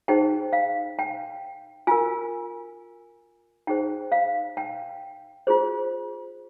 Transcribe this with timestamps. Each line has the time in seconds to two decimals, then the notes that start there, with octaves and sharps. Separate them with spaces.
0.08 D#4 G#4 C5 G5
0.53 F5
0.99 G5
1.87 F4 A#4 G#5
3.67 D#4 G#4 C5 G5
4.12 F5
4.57 G5
5.47 F4 G#4 C5